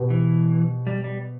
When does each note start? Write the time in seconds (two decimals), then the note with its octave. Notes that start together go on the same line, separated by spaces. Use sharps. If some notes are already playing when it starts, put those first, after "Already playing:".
Already playing: B2 B3 G4
0.10 E3
0.87 G3
1.04 G3